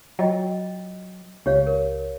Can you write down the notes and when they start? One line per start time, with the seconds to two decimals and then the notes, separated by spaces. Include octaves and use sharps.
0.19 F#3 F4 D#5 G5
1.46 C#2 G4 C#5 F5
1.67 A#4